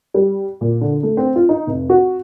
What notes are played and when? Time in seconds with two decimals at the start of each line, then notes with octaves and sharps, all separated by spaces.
0.14 G3
0.61 A#2
0.81 D3
1.03 A3
1.17 C4
1.36 F4
1.49 D#4
1.67 F1
1.90 F#4